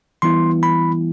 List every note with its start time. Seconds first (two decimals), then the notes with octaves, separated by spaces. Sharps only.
0.22 E3 G3 B3 E4 C6
0.63 B5